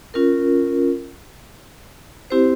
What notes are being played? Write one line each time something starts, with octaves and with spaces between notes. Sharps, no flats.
C#4 F4 A#4
C4 E4 G4 C5